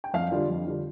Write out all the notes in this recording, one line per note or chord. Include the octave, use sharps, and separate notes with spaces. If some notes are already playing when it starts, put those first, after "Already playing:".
G5
F2 F5
D3 G3 D4 F4
F2
D3 G3 D4 F4